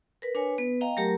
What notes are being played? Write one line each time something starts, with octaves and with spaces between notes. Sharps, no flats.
A#4 B4
D4 B4 C#5 G#5
B3 B4
D#5 F5 G5 A#5
F#3 A3 G4 A#4 A#5